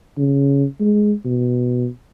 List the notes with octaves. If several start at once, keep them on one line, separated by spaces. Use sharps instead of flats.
C#3
G#3
B2